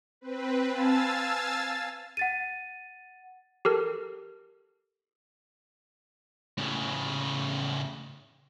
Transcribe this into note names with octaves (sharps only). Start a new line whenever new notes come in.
C4 B4
F5 G#5 A5 E6 A6
F#5 A6 D#7
G4 A4 A#4
A2 C#3